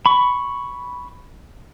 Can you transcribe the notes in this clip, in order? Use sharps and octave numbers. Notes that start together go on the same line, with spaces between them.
B5 C#6